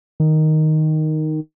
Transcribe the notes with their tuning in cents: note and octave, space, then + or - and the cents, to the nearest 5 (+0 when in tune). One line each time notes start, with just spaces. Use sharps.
D#3 +0